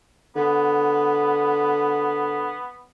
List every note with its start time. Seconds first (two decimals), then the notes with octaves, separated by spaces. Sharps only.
0.36 D3 B3